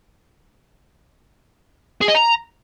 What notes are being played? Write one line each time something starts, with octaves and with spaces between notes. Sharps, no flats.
G#4
D#5
A#5